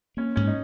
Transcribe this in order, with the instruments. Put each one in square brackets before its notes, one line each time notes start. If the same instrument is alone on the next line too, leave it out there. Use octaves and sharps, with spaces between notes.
[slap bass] A#3 [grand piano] C#4
[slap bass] G#2 [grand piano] C#4
[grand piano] D#4